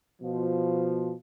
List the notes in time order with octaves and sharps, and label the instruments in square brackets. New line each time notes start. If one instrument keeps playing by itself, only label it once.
[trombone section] B2 F3